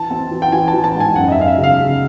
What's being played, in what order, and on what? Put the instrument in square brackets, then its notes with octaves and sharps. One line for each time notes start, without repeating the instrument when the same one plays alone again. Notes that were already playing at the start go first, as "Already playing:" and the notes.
Already playing: [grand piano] E3 A5
C4
E3
G5
E3 G#5
A5
E3
A5
G#2
G#5
F#2 F#5
D#5
E5
F#2 F5
E5
C#3
F5
C#3